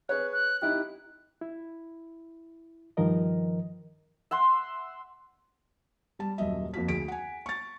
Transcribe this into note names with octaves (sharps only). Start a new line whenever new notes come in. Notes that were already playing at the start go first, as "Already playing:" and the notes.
G#4 B4 C#5 F#6
F#6
D#4 E4 G4 F#6
E4
G2 D#3 F3 A#4 D#5
E5 F#5 C6
G3 A5
D#1 F#2 D#5 E5
F2 A#3 F#4 B6
D2 G#4 B6 D7
F#5 G#5
C#6 A6